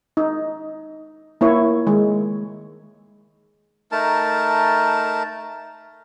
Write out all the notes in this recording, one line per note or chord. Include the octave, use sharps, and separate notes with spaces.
D#4
A#3 E4 C#5
D#3 G#3
A3 D#4 A#4 A5